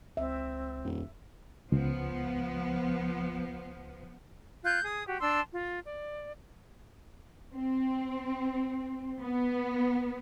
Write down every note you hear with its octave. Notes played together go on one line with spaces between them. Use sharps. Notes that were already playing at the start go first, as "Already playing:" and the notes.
C#2 C4 E5
D#1 F2
C#2 F3 B3
F4 F#6 G6
G#4 D#6
F#4 G4
D4 A5 C6 E6
F4
D5
C4
B3